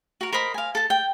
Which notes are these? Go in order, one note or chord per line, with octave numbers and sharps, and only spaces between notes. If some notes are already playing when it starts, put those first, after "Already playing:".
F#4 A#4
A#4 C5 D#5 B5
F5 G#5
A4 A5
G5